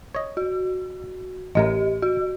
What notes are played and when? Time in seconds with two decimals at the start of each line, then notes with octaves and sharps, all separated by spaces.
0.15 C#5 D#5
0.37 F#4
1.55 A1 A2 G4 A#4 D#5
2.02 F#4